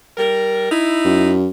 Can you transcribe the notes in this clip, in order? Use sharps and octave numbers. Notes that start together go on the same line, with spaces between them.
G3 A#4
D#4 E4
F#2